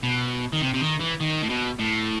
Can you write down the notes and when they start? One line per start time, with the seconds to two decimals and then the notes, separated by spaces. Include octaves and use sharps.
0.03 B2
0.53 D#3
0.62 C3
0.74 C3
0.82 D#3
1.00 E3
1.21 D#3
1.43 A2
1.50 B2
1.79 A2